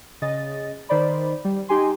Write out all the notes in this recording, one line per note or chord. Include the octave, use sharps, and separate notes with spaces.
C#3 D#5 A6
D#3 C5 D5 B5
G3
D#4 G4 G#5 C6